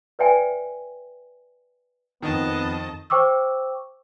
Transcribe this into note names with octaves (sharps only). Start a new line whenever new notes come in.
B4 D5 E5 G5 G#5
F2 D#3 B3 D#5 A5
C5 G5 C#6 D6 E6